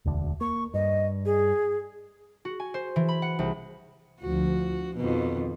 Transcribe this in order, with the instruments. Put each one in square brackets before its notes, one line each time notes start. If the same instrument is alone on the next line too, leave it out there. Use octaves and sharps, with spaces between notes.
[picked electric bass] E1 D2 D4
[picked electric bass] A#3 [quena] C#6
[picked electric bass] G2 [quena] D#5
[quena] G#4
[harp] F#4
G#5
C5
E3
B5
F#5
C2
[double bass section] D2 F3 [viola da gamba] F#4
[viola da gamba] F2 B2 [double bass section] D#3